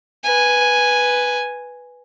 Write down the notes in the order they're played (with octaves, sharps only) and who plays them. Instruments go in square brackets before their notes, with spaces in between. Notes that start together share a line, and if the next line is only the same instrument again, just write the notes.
[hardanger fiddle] B4 G#5